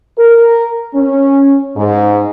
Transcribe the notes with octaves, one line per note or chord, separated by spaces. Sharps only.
A#4
C#4
G#2